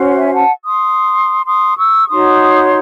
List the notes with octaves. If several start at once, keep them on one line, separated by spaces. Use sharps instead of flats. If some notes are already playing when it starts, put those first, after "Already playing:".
Already playing: C#4 F#4 C5
F#5
E5 G#5
F#5 A5
C6 D#6
C6 D#6
C#6 E6
D#4 F#4 C#5 C6 D#6